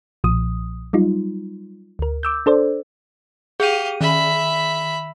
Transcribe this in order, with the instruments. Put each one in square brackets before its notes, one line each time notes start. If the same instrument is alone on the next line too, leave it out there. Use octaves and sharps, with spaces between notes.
[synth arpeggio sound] B1 A#2 F3 D#6
F#3 G3 D#4 F4
D2 A#4
D6 E6 G6
D4 A4 C5 D5
[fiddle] G4 F5 [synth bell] G#4 D#7
[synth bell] D#3 [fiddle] E5 B5